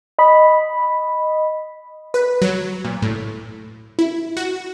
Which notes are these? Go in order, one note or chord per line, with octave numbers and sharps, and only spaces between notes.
D#5 B5
B4
F#3
A#2
A2
E4
F#4